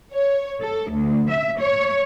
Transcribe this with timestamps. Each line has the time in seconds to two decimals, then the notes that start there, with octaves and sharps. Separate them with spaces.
0.13 C#5
0.61 A4
0.91 D2
1.29 E5
1.59 C#5